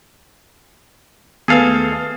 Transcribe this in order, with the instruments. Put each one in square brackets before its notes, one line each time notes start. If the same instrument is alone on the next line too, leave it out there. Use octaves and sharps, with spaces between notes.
[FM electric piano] D#2 A3 [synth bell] B3 B4 [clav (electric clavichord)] G#4 A4 F5